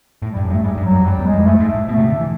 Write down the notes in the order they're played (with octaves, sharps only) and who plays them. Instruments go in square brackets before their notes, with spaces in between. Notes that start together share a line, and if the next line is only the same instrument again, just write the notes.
[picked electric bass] A2
[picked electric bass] G2 [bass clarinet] G3
[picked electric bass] F#2
G2
[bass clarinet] A3
[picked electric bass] G#2 [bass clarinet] G3
[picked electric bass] G2
[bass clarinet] F#3
[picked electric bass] G2
F2
[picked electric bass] F#2 [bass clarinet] G3
[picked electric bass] E2
[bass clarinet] G#3
[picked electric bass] F2
[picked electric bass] F#2 [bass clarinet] A3
[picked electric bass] G#2
A2
[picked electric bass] B2 [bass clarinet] A3
[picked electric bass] C3
D3
E3